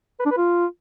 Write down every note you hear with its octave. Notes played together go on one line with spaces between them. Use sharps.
B4
D4
B4
F4